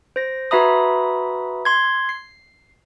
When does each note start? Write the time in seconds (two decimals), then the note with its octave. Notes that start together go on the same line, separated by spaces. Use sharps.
0.16 C5 A#6
0.51 F#4 B4 E5 A#5 B5 D#6
1.65 C6 G#6
2.09 C7